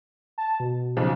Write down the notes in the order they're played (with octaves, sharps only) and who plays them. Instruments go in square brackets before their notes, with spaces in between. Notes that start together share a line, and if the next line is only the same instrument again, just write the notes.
[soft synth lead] A5
B2
[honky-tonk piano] B1 C#3 F3